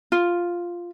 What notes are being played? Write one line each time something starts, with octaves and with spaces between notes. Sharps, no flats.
F4